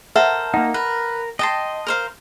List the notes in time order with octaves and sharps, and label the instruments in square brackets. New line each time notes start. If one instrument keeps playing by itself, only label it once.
[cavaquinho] A4 A#4 C5 [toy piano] E5 F#5
[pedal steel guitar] A#3 D#4 [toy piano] F#5
[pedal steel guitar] A#4 [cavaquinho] B4
[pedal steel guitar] D#5 [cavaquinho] G5 A5 C6
[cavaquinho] A#4 C5 F5